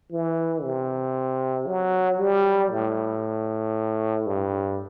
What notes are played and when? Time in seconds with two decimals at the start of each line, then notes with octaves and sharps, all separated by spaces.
0.11 E3
0.63 C3
1.67 F#3
2.19 G3
2.71 A2
4.26 G2